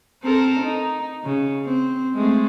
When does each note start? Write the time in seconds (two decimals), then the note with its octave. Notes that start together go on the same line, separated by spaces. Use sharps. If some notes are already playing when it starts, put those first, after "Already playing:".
0.23 C4 A4 A#4
0.61 D#4
1.24 C#3
1.65 C4
2.15 G#3 A3 C4